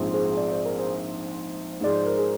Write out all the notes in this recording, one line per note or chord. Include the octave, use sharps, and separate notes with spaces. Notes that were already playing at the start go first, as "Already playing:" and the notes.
Already playing: A#1 G#2 F3 C4
G#4 C5
D5
C5
A#4
G#4 C5
G#2 F3 G#3 D5
C5
A#4
G#4